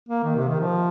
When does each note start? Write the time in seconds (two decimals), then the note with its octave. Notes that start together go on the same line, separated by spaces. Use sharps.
0.08 A#3
0.24 D#3
0.36 C3
0.48 D#3
0.60 F3